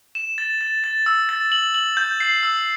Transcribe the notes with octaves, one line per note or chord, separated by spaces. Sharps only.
E7
A6
A6
A6
E6
A6
F#7
F#7
G6
C7
E6